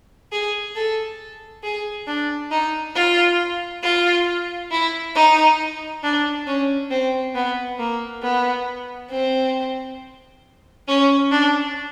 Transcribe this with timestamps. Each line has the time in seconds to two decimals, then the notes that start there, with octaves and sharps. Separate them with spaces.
0.32 G#4
0.76 A4
1.64 G#4
2.07 D4
2.52 D#4
2.96 F4
3.83 F4
4.72 E4
5.16 D#4
6.03 D4
6.47 C#4
6.91 C4
7.35 B3
7.79 A#3
8.23 B3
9.11 C4
10.88 C#4
11.31 D4